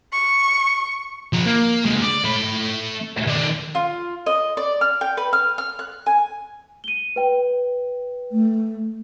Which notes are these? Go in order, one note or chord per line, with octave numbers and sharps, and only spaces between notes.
C#6
F3 A#5
A#3
D2 G#3
D5
A3 B5
D#3 D5
F4
D#5
D5
F6
G5
B4
F6
F6
F#6
G#5
D#7 G7
B4 G5
A3